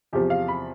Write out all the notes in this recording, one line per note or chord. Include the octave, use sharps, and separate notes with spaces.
E2 C3 F3 G4
F5
B5